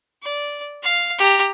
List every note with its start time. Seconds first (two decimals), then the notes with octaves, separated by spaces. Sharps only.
0.23 D5
0.83 F5
1.19 G4 A#5